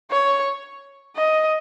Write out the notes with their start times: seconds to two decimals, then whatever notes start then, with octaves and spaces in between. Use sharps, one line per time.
0.11 C#5
1.16 D#5